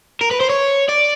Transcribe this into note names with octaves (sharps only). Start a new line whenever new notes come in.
A#4
B4
C5
C#5
D5